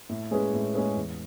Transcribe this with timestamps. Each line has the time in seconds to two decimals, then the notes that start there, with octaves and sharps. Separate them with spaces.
0.09 A2
0.31 G#3 C#4 G#4 B4
0.53 A2
0.74 G#3 C#4 G#4 B4
0.96 E2